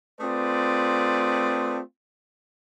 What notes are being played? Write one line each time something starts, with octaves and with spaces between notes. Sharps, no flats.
A3 C4 F4 G#4 B4 D5